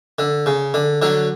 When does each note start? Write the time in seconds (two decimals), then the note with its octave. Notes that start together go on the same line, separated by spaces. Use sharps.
0.19 D3
0.46 C#3
0.74 D3
1.02 D3 F#3